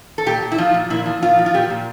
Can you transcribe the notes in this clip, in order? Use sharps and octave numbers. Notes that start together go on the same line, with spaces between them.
A4
A#2 G4
A#2
E4
F3 F4
A#2
A#2 E4
F3
A#2 F4
F3
F4
A#2 G4
A#2